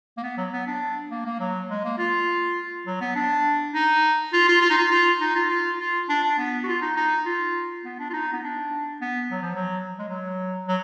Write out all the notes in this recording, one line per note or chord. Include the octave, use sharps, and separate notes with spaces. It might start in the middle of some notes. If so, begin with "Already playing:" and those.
A#3
B3
F#3
B3
D4
A#3
A#3
F#3
G#3
A#3
F4
F#3
B3
D4
D#4
F4
F4
F4
D#4
F4
F4
D#4
F4
F4
F4
D4
D4
B3
F#4
F4
D#4
D#4
F4
B3
D4
F4
D#4
B3
D4
B3
F#3
F3
F#3
G#3
F#3
F#3